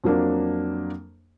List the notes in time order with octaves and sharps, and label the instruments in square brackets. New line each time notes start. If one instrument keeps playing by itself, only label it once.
[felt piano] F2 F#3 A#3 D4